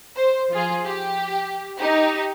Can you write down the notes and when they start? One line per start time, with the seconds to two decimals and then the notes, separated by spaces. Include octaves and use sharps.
0.15 C5
0.50 F3 F4 G#4
0.86 G4
1.78 D#4 G4